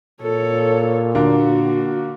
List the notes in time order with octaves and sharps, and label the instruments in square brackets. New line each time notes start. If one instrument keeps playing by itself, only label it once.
[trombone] A#2 [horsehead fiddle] A4 C#5
[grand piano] D3 A#3 [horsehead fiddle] F#4